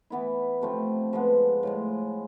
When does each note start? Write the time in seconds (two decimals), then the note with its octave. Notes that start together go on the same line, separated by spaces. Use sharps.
0.10 E3 B3 E4
0.61 C3 F3 A3 C4
1.13 G#2 F3 G#3 B3
1.63 A2 F3 G#3